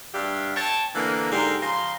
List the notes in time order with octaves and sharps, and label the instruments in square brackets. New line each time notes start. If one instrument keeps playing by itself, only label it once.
[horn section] G2 D4 G4 E5 F5
C#5 G5 A5
D3 E3 A#3
G#2 D3 G4 A#4 C6
C#3 F3 A#5 C6